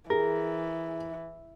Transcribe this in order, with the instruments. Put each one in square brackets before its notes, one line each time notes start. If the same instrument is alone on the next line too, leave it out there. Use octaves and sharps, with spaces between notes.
[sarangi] E3 [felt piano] G#4 [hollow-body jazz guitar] A#4